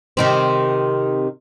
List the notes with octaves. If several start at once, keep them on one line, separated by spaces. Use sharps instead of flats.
C3 D#3 C4